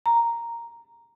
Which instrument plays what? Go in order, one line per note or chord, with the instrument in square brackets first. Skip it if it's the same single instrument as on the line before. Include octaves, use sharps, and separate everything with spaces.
[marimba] A#5